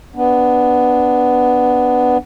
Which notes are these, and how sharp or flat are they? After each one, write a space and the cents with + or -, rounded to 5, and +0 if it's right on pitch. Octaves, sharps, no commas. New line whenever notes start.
B3 +5 D4 +0